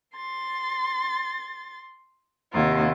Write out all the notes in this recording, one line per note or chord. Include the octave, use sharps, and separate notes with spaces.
C6 A6
D#2 C3 E4 F4 F#5